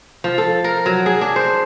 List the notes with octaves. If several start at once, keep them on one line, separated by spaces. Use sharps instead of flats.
F3
A4
A#4
F#3
G#4
D4
C5